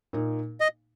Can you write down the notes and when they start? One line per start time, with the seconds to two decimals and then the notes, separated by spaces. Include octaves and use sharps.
0.13 A#2 A#3 D#4
0.61 D#5